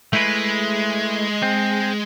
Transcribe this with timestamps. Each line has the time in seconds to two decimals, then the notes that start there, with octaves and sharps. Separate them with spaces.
0.13 G#3 A3 E4 B4
1.42 C4